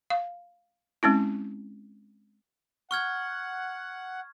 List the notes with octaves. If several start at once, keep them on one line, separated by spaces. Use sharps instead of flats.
F5
G#3 C4 C#4 E4
F#5 C#6 F6 G#6